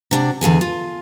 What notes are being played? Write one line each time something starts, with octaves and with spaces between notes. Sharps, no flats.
C3 D4 F#4
E2 D3 G#4 G#5
F4